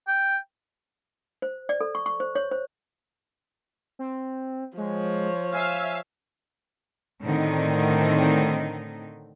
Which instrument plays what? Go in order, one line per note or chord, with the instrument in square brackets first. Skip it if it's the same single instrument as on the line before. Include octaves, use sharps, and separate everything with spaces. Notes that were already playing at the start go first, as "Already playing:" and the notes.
[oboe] G5
[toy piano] C5
D5
A4
C#6
C#6
C5
C#5
C5
[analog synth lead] C4
[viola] F3 C#5 [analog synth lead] G#3
[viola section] E5 F5 [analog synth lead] G#5
[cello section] A2 D3 D#3 C4 D#4